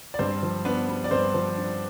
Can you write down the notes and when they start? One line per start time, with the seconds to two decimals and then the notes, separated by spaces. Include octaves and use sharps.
0.14 D5
0.19 G2 C4 C5
0.43 F3
0.65 B3 D4 B4
0.89 B3
1.04 D5
1.11 G2 C4 C5
1.34 F3
1.57 D4